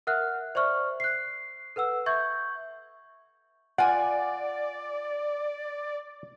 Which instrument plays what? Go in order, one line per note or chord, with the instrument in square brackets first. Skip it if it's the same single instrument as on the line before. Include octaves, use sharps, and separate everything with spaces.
[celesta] A#4 E5 F#5 F6 F#6
C5 D5 E5 C#6 F6
F#6 C7
A4 B4 F#5 E6
E5 C#6 G6 G#6
[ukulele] F4 G#5 [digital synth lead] D5 [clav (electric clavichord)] F#5